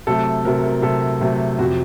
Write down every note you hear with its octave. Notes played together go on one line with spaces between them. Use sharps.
C3 F#3 A3 A4
C3 F#3 A3 A#4
A#4
C3 F#3 A3 A4
C3 F#3 A3
F2 C3 F#3 F#4